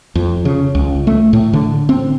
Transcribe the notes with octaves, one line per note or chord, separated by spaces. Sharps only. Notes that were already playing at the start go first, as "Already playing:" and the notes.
F2
C#3
C#2
A3
A2
D3
C4